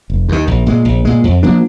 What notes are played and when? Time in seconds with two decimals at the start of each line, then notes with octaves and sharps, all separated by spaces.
0.10 F1
0.29 D#2 D#3
0.47 A#1
0.66 A#2 G#3
0.85 A#1
1.05 A#2 G#3
1.24 F2
1.43 F3 A#3 D4